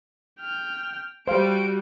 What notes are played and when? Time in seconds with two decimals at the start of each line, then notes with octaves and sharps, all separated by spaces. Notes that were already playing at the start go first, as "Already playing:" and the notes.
0.41 G5 F6
1.27 G3 F#4 C5 F5 D7